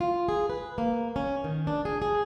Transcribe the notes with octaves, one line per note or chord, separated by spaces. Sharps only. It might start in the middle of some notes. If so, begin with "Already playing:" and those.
F4
G#4
B4
A#3
C#4
D#3
D4
G#4
G#4